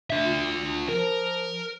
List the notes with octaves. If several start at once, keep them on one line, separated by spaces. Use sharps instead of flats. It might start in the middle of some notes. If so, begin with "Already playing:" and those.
D4 E5
F4
F3 A#4